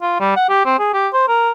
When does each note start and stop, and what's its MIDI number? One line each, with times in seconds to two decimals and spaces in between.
0.02 0.16 65
0.20 0.33 55
0.36 0.48 78
0.49 0.63 67
0.66 0.77 60
0.79 0.92 68
0.94 1.08 67
1.13 1.26 72
1.28 1.51 70